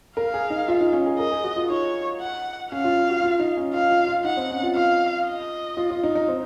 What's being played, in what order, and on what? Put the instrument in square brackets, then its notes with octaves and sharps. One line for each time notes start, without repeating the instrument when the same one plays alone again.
[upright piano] A#4 [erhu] F5
[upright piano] G#4
D#4
F4
D#4
C#4
G#4
[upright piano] A#4 [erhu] D#5
[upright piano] G#4
F#4
F4
[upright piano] D#4 [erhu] C#5
[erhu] F#5
[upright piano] C#4 [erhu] F5
[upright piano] F4
F#4
F4
D#4
C#4
[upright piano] F4 [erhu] F5
[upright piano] F4
F4
[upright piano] D#4 [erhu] F#5
[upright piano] C4
C#4
F4
[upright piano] F4 [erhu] F5
[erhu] D#5
[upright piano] F4
F4
D#4
D#4
C4